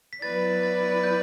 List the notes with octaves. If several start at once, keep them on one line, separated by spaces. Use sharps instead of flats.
B6
F#3 B3 E4 B4 D5 A6
A6
G6